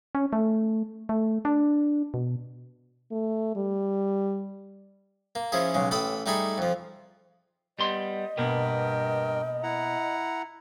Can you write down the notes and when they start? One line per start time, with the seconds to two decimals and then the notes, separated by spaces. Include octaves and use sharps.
0.15 C#4
0.33 A3
1.09 A3
1.45 D4
2.14 B2
3.11 A3
3.56 G3
5.35 A#3
5.52 F3 C#4 E4 G#4
5.74 B1 C#3 G#3
5.91 A1 A4 G5 B5 D#6
6.26 G3 A3 D#4 G#4 B5 C#6
6.58 F2 F3
7.79 G3 B3 D#5 C6
8.38 G2 B2 A#3 B3 A#4 G5
9.63 E4 F#5 A#5